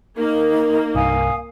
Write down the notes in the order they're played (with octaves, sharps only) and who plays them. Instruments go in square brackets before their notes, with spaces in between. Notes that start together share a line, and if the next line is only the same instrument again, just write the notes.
[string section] A#3 [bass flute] D#4
[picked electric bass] C2 G2 [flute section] F5 G#5 D#6